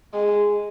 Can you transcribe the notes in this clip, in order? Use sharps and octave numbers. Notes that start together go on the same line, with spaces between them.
G#3